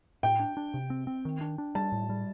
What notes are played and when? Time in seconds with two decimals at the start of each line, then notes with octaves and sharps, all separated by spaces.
0.23 A2 G5
0.40 D4
0.57 D4
0.74 C3
0.90 C4
1.07 C4
1.25 D#3
1.41 D4
1.58 D4
1.75 G3 A5
1.92 A2
2.10 G3